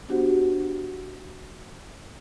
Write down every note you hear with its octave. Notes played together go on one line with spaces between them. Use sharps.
B3 D4 F#4 G4 C5 F#5